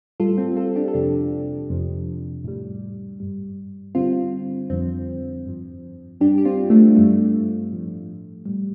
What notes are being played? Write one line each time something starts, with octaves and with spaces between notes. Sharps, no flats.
A2 G3 F4 A4
C4
F4 A4
D4 G4
A4
F2 C3 F3 D4 G4
F2 C3 F3
A2 G3
G2 G3
G2 D3 G3 C4 F4
F2 D3 F3 C4
G2 F3
G2 G3 D4 G4
G4
C4 F4
A3 D4
G2 G3 A3
A2 F3
A2 G3